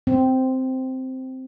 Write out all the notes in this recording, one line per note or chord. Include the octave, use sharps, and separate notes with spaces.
C4